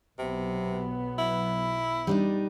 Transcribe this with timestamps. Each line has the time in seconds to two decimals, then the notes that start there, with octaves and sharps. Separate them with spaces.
0.19 B1 C3 F#3 B3
1.18 E4
2.07 G3 D4 D#4